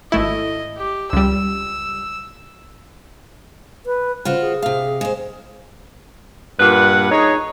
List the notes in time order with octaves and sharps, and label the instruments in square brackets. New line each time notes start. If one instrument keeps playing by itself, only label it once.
[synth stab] G#1 A3 E4 [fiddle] D#5
[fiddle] G4
[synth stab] C#2 G3 [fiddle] E6
[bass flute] B4
[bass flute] C#3 [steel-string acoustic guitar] F4 F#4 C5
[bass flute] G#4
[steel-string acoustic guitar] C3 F5
G#3 C5
[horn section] G2 A#2 B4 F#5
D#4 G#4 C#5